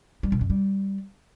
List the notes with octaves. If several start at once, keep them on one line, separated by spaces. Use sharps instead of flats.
G3
B2
F#2
G3